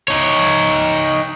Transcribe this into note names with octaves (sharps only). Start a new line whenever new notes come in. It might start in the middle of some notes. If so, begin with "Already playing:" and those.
D#4 C#5